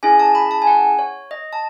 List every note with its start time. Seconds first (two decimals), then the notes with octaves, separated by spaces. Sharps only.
0.03 C#4 E4 G#4 G#5
0.19 A5
0.35 B5
0.51 A5
0.62 G#5
0.67 F#5
0.99 C#5
1.31 D#5
1.53 A5